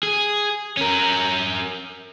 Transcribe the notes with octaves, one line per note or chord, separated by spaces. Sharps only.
G#4
C#4 A#4